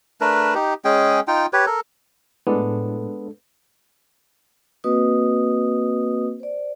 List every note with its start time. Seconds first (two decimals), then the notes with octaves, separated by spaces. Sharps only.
0.21 A3 D4 A#4 B4
0.55 D#4 G4
0.85 G#3 C#4 G#4 G5
1.28 D#4 F4 G5
1.53 G4 B4 C#5
1.66 A4 A#4
2.47 A2 G#3 B3 D4 A4
4.84 A#3 C4 F#4 B4 D#5 D#6
6.40 C5 D5